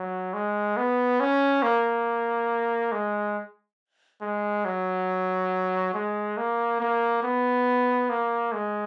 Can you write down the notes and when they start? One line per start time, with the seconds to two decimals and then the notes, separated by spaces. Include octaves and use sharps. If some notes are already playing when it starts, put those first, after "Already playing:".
Already playing: F#3
0.34 G#3
0.77 B3
1.20 C#4
1.63 A#3
2.92 G#3
4.21 G#3
4.65 F#3
5.94 G#3
6.37 A#3
6.80 A#3
7.23 B3
8.09 A#3
8.53 G#3